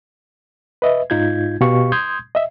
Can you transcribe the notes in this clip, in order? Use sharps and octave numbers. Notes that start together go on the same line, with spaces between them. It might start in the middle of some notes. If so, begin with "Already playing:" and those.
B4 D#5 E5
G#2 D#4 F4 G6 G#6
B2 G4 F5 C#6
C6 D#6 G6 G#6
D#5 E5